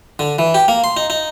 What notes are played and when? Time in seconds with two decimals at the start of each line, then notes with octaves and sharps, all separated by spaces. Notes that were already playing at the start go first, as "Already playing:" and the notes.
0.19 D3
0.39 E3
0.54 G4
0.68 A#3
0.84 C6
0.97 D#4
1.10 D#4